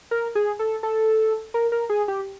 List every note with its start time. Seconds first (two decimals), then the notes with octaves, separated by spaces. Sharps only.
0.11 A#4
0.35 G#4
0.59 A4
0.83 A4
1.54 A#4
1.72 A#4
1.89 G#4
2.08 G4